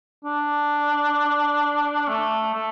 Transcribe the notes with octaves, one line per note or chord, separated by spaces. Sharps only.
D4
A3
A3